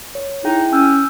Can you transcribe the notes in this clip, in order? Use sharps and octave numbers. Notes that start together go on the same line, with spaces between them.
C#5
D#4 E4 G#4 G5
C#4 G#5 E6 G6